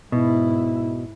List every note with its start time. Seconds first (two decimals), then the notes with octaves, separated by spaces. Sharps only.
0.12 G#2 B2 E4